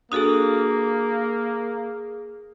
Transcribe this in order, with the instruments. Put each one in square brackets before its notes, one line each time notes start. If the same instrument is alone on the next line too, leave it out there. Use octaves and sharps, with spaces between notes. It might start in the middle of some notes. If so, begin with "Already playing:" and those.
[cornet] A#3 [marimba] D4 F#4 A4 [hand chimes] G#4 D#6